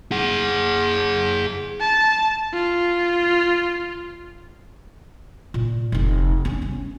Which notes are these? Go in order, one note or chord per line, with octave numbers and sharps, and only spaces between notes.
G#4 F#5
A5
F4
A#2
F1 D#4
C#4 D4
C#4